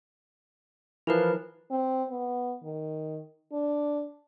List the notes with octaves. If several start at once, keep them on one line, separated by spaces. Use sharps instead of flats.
E3 F3 E4 A#4 B4
C4
B3
D#3
D4